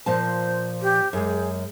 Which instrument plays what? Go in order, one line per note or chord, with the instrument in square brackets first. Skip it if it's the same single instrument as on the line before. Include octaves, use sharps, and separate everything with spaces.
[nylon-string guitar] A#2 F3 A5 [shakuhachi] C5
[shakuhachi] G4
[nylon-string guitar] F#2 G#3 [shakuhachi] G#4